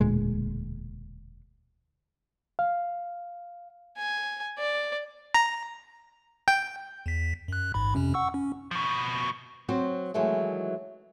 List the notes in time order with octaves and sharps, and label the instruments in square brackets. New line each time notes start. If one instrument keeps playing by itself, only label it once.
[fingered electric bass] E1 D2 A#2 G#3
[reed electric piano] F5
[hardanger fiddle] G#5
D5
[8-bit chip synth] A#5
G5
E2 B6
F#2 F#6
A1 G#2 B5
F2 C3 C#4
F#5 C#6 E6
C#4
[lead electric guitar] B2 F3
[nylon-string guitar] F#3 C4 F#4 C5
D#3 E3 F#3 G#3 A3